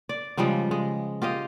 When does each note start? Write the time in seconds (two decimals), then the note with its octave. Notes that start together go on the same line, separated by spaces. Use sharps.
0.09 D5
0.37 C#3 F3 G3 G#3
0.71 G#3
1.22 F4 G4 D#5 F5